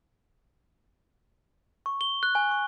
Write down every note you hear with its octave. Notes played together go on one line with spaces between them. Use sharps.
C#6
G7
F#6
G#5
C#6